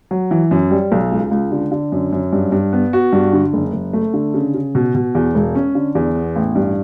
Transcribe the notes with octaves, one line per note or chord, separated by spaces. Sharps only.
F#3
E3
F#2
G3
B1
C#2
C#2
D3
D3
F#2
F#2
G2
G2
B3
F#4
G2
D3
F#1
F#1
A3
D3
C#3
C#3
B2
B2
E2
E1
C#4
D3
E2
B3
A1
G2